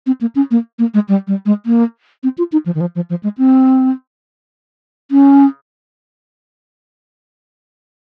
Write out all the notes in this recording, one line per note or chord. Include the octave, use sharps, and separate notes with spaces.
C4
A#3
C#4
A#3
A#3
G#3
G3
G3
G#3
A#3
C4
F4
D#4
F3
D#3
F3
F3
F3
G#3
C4
C#4